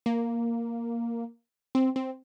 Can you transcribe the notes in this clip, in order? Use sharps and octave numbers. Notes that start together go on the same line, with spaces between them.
A#3
C4
C4